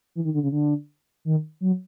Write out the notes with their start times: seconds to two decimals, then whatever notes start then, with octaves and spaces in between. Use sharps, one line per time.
0.15 E3
0.25 D#3
0.34 D3
0.43 C#3
0.52 D3
1.25 D#3
1.61 F#3